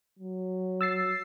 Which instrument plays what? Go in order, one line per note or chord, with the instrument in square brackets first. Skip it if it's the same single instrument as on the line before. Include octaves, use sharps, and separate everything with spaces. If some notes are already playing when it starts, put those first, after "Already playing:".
[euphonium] F#3
[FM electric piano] E6 A6 C7